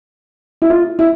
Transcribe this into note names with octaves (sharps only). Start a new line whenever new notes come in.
E4
F4
E4